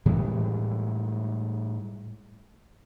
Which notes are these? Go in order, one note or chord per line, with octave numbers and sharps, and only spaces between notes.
A2 E3 G3 G#3